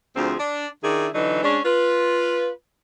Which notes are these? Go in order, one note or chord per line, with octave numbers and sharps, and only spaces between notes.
D2 F3 C4 G#4
D4
D#3 D4 E4 G#4
D3 E3 F#3 D#4
G#3 C#4 D4
F4 B4